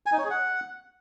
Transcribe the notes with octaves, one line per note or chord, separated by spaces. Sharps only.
G#5
D#4
C#5
G#4
F#5